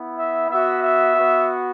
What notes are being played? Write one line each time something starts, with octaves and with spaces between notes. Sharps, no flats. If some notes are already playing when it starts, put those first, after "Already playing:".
Already playing: B3 E4
E5
B3 F#4 E5
E5
B3 F#4